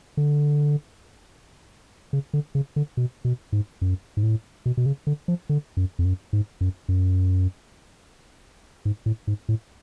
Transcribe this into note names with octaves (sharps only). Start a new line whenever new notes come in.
D3
C#3
D3
C#3
D3
B2
B2
G#2
F#2
G#2
A2
B2
B2
C#3
D3
F3
D3
F#2
F2
F#2
G#2
F#2
F#2
G#2
A2
G#2
A2